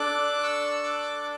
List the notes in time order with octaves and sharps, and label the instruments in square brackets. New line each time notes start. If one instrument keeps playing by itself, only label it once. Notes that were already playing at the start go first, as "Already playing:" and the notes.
Already playing: [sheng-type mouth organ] D4 A4 D6 F#6
C#6 E6
D6 F#6